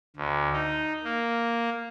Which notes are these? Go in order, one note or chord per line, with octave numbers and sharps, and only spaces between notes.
D2
D#4
A#3